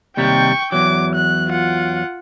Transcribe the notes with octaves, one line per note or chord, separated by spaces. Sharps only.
D#2 C3 G3 G5 C#6
E2 F#3 D6
F#6
F4 F#5